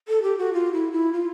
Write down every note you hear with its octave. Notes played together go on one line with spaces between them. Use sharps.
A4
G4
F#4
F4
E4
E4
F4